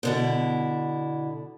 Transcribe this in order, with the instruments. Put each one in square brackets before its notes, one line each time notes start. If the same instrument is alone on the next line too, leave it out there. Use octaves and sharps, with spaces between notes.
[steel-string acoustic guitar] B2 D3 E4